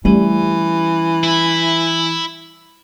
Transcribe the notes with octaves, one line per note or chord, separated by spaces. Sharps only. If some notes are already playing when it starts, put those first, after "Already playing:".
E3 G3 A3 C#4
E4